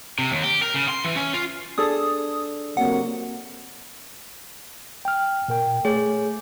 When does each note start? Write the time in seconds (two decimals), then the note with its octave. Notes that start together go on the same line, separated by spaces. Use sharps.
0.19 C3
0.31 D#2
0.44 G4
0.62 A#4
0.74 C#3
0.88 C6
1.04 E3
1.16 C#4
1.34 F4
1.78 D4 G#4 A4 D#6
2.77 C3 F#3 A#3 F#5
5.05 G5 F6
5.48 A#2 A#4 G5
5.85 A3 G#4 C#5